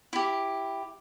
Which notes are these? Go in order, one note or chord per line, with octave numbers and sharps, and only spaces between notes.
E4 G4